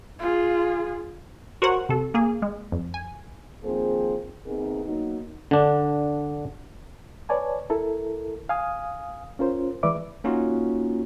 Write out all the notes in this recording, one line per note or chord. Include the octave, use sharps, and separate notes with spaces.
F4 G#4
F#4 A#4 C5 C#5 F#5
C3 A4
A#3 G#4
G#3
F2
G#5
D#3 F3 A#3 C4 G#4 C5
D#2 C3 B3 D#4 G#4 A#4
F#3 A#3 B3 D#4
D3 D4
B4 C#5 D5 G#5 A5
E4 A4 A#4
F5 G#5 D#6
C#4 F4 A#4 C5
E3 G#3 B4 D5 E5 D6
A#3 C#4 D#4 F4 F#4